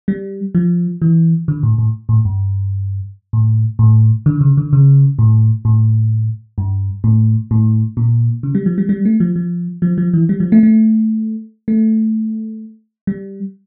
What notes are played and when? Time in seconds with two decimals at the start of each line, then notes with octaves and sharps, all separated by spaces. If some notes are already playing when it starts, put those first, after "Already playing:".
0.08 G3
0.55 F3
1.02 E3
1.48 D3
1.63 A2
1.78 A2
2.09 A2
2.25 G2
3.33 A2
3.79 A2
4.26 D3
4.41 C#3
4.57 D3
4.73 C#3
5.19 A2
5.65 A2
6.58 G2
7.04 A2
7.51 A2
7.97 A#2
8.43 C#3
8.55 G3
8.66 F3
8.78 G3
8.89 G3
9.05 A3
9.20 F3
9.36 F3
9.82 F3
9.98 F3
10.14 E3
10.29 G3
10.40 F3
10.52 A3
10.63 A3
11.68 A3
13.07 G3